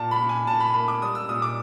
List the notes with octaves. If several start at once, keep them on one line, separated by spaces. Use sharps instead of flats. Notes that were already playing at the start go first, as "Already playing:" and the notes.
Already playing: A#2 A5
B5
A#2
G#5
A#2 A5
B5
A#3 B5
D6
G3 D#6
E6
A#2 D#6
D6